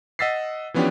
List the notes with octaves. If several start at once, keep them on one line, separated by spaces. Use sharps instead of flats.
D#5 F#5 E6 A6 B6 C7
E3 F3 B3 C#4 D4 G4